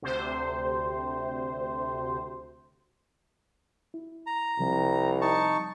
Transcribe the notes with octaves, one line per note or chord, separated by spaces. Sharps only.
D2 C3 C5
E4
A#5
C2 C3 F3 G3
D#4 A5 C#6